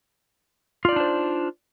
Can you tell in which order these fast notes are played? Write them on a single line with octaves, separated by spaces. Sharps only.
F4 D5 D#4 D4 C5